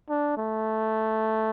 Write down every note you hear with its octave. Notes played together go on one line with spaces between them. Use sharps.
D4
A3